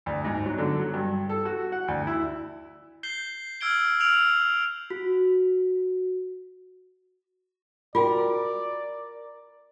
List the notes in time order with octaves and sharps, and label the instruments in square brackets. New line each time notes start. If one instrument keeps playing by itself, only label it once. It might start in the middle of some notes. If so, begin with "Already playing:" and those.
[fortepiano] D2
G#2
F#3
D3
F#3
G2
A4
F#4
F#5
D2
E4
[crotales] G6 C7 G7
E6 F6 G#6 D7 G7
E6 F6 D7 F7 F#7
[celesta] F#4
[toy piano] F4 F#4 G5 [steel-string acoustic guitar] A#4 [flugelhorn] D5